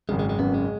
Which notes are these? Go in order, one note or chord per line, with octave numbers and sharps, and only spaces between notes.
G#1 F#2 C#3 G#3
G#3
G#3
G#1 F#2 C#3 B3
G#3